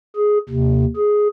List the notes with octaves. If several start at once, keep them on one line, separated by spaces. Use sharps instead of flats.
G#4
D#2 C3
G#4